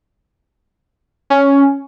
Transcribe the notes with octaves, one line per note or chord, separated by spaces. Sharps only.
C#4